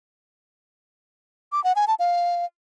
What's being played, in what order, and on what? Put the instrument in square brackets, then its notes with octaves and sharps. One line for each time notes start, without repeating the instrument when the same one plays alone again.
[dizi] D6
F#5
G#5
A5
F5